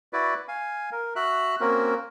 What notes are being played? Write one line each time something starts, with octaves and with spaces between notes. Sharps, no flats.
E4 F#4 B4 D5
F5 G#5
A#4
F#4 E5 F#6
A#3 C4 C#4 F#4 A#4